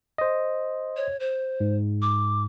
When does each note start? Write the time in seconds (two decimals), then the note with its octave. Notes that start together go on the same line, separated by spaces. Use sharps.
0.18 C5 D#5
0.97 C#5
1.20 C5
1.60 G#2
2.02 D6